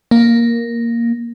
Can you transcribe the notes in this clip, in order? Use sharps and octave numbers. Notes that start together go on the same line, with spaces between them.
A#3